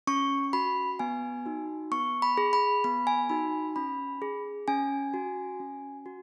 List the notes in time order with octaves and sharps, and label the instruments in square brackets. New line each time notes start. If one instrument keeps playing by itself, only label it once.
[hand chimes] C#4 C#6
F#4 B5
B3 G#5
D#4 F#4
B3 C#6
B5
G#4
B5
B3 B5
G#5
D#4 F#4 B5
C#4 B5
G#4
C#4 G#5
F#4
C#4
F#4